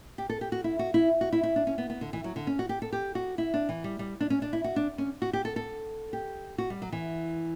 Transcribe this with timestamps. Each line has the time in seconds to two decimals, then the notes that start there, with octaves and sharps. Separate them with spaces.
0.18 G4
0.29 A4
0.41 G4
0.52 F#4
0.64 E4
0.79 F#4
0.94 E4
1.21 F#4
1.32 E4
1.43 E4
1.56 D4
1.67 C#4
1.78 B3
1.90 B3
2.01 D3
2.13 E3
2.24 F#3
2.36 D3
2.47 C#4
2.59 F#4
2.69 G4
2.82 A4
2.92 G4
3.15 F#4
3.38 E4
3.54 D4
3.69 E3
3.84 G3
3.99 G3
4.21 D4
4.30 C#4
4.42 D4
4.53 E4
4.64 F#4
4.76 D4
4.98 C#4
5.22 F#4
5.33 G4
5.45 A4
5.56 A4
6.13 G4
6.58 F#4
6.70 G3
6.82 F#3
6.92 E3